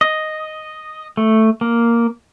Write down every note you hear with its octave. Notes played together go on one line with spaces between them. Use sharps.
D#5
A3
A#3